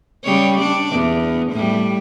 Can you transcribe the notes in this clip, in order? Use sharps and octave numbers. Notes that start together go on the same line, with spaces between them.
C#3 G3 C#5
D4 D5
E2
A2 G3